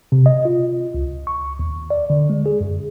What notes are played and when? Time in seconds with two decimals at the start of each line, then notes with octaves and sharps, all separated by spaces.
0.12 C3
0.26 D#5
0.45 F4
0.94 C#2
1.27 C#6
1.59 D#2
1.90 D5
2.10 D3
2.30 G#3
2.46 G#4
2.60 F#2